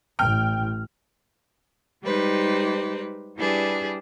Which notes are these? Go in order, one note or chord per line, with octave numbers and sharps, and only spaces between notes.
A1 G5 F6
G3 G#3 D#4 G4 B4 C5
G3 D4 E4 G4 G#4 B4